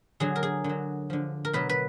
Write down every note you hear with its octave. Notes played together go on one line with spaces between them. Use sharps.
D3 F#3 G#4
A#4
G#4
D3 F#3
D3 F3
A#4
B2 F#3 B4
B4